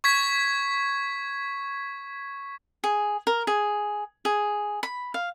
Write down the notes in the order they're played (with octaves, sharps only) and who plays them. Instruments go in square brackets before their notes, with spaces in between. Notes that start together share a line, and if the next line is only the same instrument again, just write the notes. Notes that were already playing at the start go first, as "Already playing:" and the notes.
[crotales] C#6 G#6 B6
[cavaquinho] G#4
A#4
G#4
G#4
B5
F5